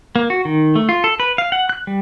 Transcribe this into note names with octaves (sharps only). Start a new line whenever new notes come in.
A#3
F#4
D#3
A3
F4
A4
B4
F5
F#5
F#6
G3